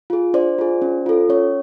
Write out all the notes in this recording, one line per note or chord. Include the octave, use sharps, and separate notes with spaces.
F4 G#4
D4 C5 D5
F4 G#4
C#4
F4 A4
C#4 C#5